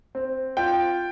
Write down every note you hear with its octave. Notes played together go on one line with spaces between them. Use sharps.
C4
F4 G5